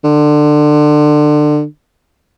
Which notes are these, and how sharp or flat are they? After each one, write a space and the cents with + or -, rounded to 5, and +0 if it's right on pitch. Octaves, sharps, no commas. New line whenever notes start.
D3 +25